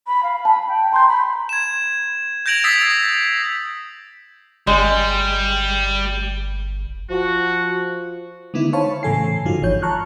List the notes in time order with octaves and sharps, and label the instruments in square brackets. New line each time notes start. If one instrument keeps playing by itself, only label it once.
[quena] B5
F5
[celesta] A5 [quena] B5
[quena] G5
[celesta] A#5 G6 [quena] C6
[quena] B5
[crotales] G#6 E7
G6 G#6 A#6 D7 F7 F#7
D#6 E6 A6 B6 C7
[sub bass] G1 [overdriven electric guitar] G3 [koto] G#3
[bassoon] F3 [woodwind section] F#4
[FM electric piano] D3 D#3 G#3 B3 D#4 E4
C5 C#5 F5 A5 B5 C#6
A2 C#3 E3 A4 G#5 C7
G2 D3 F3 D#4 F4 F#4
G#1 E3 F3 C#5 G6
A5 A#5 C#6 F6 F#6